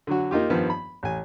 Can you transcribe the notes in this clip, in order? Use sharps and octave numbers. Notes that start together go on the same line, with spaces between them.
D3 F#3 F#4
A#3 D#4 F4 G4
G2 D#3 F3 B3
B5
A1 G#5